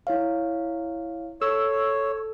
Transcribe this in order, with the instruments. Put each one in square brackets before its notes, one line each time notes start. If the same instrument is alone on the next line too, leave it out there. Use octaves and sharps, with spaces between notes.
[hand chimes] E4 C#5 F5
[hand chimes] A4 [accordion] C#5 [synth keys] E6